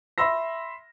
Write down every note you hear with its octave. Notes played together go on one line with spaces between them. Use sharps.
E5 B5 C6 E6 A#6